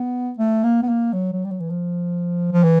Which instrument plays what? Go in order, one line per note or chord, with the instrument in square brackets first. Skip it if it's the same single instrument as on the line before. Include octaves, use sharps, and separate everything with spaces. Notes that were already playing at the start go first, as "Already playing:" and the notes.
Already playing: [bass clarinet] B3
A3
A#3
B3
A#3
F#3
F#3
G3
F#3
E3
F3
F3
E3